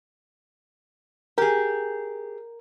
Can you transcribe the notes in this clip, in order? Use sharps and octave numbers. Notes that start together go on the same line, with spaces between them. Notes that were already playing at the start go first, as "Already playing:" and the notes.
G4 G#4 A#4